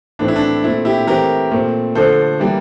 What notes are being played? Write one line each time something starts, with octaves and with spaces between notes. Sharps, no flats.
A2 E3 A3 C4 D4
E4
D4
A#2 A3 C4 E4
E4 G4
E3 A3 C4 G4 A#4
A#2 A3 C4
D3 F3 A3 A4 C5
E3 G3 A#3